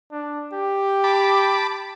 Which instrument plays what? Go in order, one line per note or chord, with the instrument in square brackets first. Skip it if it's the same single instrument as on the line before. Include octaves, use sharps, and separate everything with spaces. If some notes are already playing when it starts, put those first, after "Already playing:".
[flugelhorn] D4
G4
[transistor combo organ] A5 B5 D6